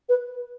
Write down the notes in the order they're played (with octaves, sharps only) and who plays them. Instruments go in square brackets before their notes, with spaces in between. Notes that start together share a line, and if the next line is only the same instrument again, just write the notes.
[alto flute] B4